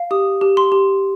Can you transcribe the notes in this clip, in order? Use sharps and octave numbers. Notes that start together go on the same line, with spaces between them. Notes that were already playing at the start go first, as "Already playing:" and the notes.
Already playing: F5
G4 D#6
G4
C6
G4